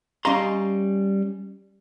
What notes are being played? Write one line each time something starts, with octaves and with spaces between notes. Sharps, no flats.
G3 C#4 D#5 F5 A#5 C6